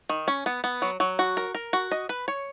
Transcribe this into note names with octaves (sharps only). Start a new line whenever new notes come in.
D#3
C#4
B3
B3
F#3
F#3
F#4
A#4
A#4
F#4
D#5
B4
C#5